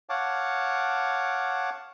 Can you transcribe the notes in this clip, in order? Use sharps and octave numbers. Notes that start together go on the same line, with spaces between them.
C#5 F5 F#5 A5 D6